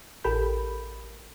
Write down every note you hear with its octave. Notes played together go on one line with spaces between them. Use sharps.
A1 G4 A4 A#4 B5 G6